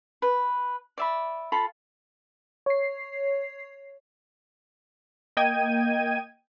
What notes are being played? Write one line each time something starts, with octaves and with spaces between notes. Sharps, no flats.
B4
D5 E5 B5
F4 A4 B5
C#5 C7
A#3 D#5 G5 G#6 D#7